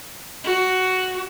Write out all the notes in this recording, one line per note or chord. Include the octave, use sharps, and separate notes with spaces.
F#4